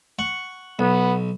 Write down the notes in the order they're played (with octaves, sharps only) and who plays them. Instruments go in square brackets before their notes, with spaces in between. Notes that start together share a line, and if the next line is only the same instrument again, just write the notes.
[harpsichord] F#5 C#6
[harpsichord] B1 [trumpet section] B3